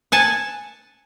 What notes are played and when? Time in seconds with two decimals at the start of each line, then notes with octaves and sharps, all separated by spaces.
0.12 F#5 G#5 A5